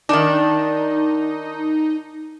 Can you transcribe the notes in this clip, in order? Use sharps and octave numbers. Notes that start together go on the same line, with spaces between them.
D#3 D4 D#4